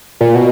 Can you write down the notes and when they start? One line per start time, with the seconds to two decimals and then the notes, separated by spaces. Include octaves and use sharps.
0.21 A#2
0.35 B2